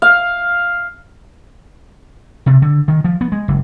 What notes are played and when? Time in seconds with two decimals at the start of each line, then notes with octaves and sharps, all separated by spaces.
0.02 F5
2.46 C3
2.62 D3
2.88 D#3
3.04 F3
3.21 B3
3.32 G#3
3.48 F#1